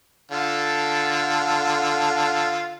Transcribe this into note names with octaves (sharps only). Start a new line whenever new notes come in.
D3 F4 A4